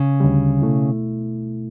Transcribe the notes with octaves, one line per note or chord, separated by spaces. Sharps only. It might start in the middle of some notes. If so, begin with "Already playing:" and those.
Already playing: C#3
D2 D3 G3
B2 A3 E4